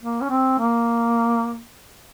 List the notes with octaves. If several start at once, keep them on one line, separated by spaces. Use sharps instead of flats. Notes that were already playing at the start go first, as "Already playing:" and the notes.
A#3
C#4
C4
A#3